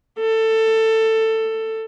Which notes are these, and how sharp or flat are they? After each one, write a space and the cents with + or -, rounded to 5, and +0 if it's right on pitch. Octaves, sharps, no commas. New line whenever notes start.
A4 +15